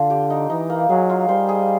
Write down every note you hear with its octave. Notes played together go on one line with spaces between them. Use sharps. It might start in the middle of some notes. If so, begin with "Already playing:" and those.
Already playing: D3 D4 F4
G4
D#4
E3 D#4
A#3
F#3 G#4
F4
G3 C5
G#4